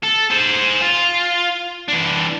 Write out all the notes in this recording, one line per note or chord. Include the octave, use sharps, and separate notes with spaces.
A4
G#4 C5
F4
E3 D4